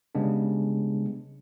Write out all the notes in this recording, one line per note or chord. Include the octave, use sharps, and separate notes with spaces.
C#3 G3 G#3 B3 D4